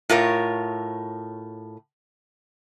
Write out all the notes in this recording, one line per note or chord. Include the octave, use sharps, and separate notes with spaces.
A2 F4 A#4 C#5